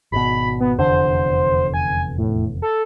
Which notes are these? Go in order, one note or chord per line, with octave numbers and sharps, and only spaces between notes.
G#1 B2 B5
B3
F1 E2 D3 C5
G#5
A2
A4